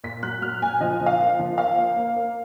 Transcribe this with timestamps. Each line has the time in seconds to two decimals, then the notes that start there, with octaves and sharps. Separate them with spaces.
0.04 A#2 B6
0.23 F#3 F#6
0.42 F#3 F6
0.62 A#2 G#5
0.81 F3 D#5
1.00 F3
1.06 F5
1.20 A#3
1.39 F3
1.58 A#3 F5
1.78 A#3
1.96 A#3
2.16 A#3